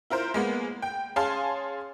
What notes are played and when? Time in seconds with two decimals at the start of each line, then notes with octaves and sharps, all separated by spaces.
0.10 E4 F4 A#4 C5
0.34 G#3 A#3 B3
0.82 G5
1.16 C#4 G#4 F5 A5 C6